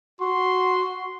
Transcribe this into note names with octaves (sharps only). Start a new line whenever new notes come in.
F#4 C6